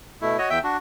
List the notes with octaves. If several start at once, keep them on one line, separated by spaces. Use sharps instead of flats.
B2 A3 E4
F#4 C#5 D#5
E2 E5 G5 G6
D4 F#4